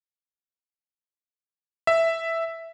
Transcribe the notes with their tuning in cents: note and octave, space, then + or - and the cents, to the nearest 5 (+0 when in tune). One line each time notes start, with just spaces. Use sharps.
E5 +0